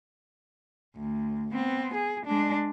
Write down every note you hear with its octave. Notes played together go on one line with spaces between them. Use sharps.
D2
B3 C4
G#4
G#3 D4